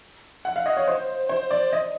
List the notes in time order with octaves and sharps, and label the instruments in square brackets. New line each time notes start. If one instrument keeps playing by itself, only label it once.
[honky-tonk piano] F#5
F5
D#5
C#5
C5
C5
D5
D#5